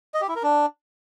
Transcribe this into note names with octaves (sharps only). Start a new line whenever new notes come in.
D#5
G4
E4
A#4
D4